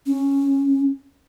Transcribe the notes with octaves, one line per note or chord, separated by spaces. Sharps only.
C#4